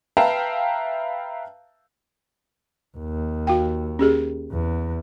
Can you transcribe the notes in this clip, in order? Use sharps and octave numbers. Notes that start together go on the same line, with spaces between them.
B4 E5 F5 G5 A5 A#5
D#2
F#4 F5 G5
C#4 G4 G#4
E2